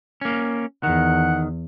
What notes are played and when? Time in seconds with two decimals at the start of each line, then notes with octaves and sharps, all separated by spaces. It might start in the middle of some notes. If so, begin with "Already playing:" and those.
0.21 A#3 C#4
0.83 E2 D#3 F#5